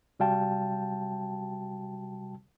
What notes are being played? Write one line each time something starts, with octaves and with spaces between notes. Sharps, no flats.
C3 G3 F#4 F5 G5 A5